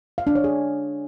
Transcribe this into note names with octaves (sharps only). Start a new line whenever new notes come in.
F5
D4
C#5
G#4